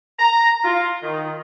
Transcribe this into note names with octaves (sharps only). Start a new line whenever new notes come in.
A#5
F4
D#3